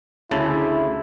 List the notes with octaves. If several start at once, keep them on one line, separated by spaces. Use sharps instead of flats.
D2 C#3 E4 A5